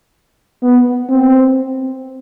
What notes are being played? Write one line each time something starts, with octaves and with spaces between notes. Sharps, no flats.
B3
C4